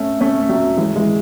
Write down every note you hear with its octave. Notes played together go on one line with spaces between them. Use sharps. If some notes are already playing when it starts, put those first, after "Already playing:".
Already playing: A3 C#4
A3 C#4
F#3 A3
E3 G#3
E3 G#3